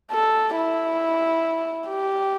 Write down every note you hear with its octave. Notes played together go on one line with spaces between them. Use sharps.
A4
E4
G4